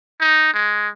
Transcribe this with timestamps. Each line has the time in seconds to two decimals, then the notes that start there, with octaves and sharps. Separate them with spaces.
0.20 D#4
0.54 G#3